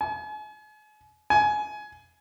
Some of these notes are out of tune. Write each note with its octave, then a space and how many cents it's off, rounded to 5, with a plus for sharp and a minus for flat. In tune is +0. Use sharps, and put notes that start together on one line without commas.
G#5 +40
G#5 +20